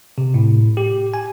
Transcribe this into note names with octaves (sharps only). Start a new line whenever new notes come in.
C3
A2
G4
G#5